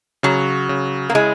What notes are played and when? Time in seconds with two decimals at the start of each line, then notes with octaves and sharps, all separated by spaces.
0.23 C#3 F#3
0.69 C#3
1.10 A#3
1.15 G#3 E4